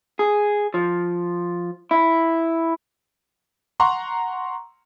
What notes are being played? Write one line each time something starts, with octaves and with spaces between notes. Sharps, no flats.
G#4
F3
E4
F#5 A#5 C6 C#6